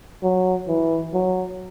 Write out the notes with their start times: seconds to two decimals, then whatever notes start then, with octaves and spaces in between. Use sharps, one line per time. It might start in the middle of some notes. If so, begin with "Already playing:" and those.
0.23 F#3
0.68 E3
1.13 F#3